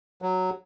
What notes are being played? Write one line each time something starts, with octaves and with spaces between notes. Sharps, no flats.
F#3